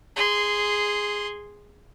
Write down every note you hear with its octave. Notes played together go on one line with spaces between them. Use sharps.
G#4 C6